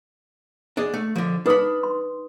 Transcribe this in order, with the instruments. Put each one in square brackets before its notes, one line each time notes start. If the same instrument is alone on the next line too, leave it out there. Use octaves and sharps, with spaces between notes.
[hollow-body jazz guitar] D4 G#4 D#5
A3
D3 F3
[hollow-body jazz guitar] D4 B5 [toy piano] D#4 B4 D#6
[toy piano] C6